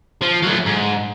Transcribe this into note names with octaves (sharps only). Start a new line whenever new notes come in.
F3
F#3 A3
G#2